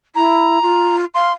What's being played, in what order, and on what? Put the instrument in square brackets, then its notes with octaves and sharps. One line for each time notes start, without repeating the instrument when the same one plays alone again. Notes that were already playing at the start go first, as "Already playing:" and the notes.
[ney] E4 [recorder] A#5
[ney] F4
[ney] F5 [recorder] C6